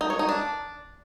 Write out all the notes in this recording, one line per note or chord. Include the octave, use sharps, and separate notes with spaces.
D#4
C#5
D#4
D4